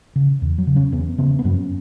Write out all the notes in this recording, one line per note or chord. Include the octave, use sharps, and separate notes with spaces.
C#3
E2
F#3
C#3
C#4
E2 B3
C#3 B3
B3
F#2 C#4